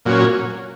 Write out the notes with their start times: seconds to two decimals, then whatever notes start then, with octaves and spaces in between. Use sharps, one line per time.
0.05 A#2 F#3 C#4